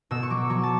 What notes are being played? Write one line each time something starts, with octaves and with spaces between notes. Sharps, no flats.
B2 E6
C#6
F#3 D6
F#3 C#6
A5